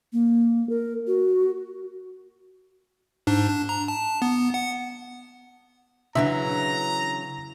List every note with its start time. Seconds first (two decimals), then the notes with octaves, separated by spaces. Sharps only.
0.13 A#3
0.69 A#4
1.07 F#4
3.27 G#2 D4
3.49 D4
3.69 A#5
3.88 A5
4.22 B3
4.54 F#5
6.15 C#3 E3 F#3 D4 E4 E5 A#5